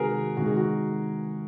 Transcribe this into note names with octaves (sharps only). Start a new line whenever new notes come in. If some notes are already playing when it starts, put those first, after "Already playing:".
Already playing: C3 D#3 G#3 F#4 G#4 A#4
C3 D#3 G#3 F#4
G#4
F#4